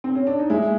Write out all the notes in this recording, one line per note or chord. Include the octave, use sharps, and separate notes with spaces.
C4
C#4
D4
D#4
G#3 E4